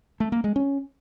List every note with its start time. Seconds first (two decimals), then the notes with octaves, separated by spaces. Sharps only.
0.20 A3
0.32 A#3
0.44 G#3
0.56 C#4